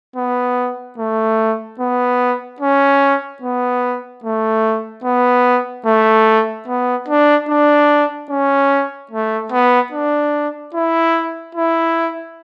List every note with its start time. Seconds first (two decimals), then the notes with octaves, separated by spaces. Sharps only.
0.16 B3
0.98 A3
1.79 B3
2.61 C#4
3.42 B3
4.24 A3
5.04 B3
5.86 A3
6.68 B3
7.08 D4
7.49 D4
8.30 C#4
9.11 A3
9.52 B3
9.92 D4
10.74 E4
11.55 E4